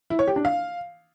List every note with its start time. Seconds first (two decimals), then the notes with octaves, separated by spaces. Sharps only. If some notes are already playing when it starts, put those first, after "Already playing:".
0.10 E4
0.19 C#5
0.28 G4
0.36 D4
0.45 F5